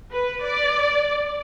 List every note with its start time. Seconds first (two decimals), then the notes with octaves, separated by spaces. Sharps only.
0.11 B4
0.43 D5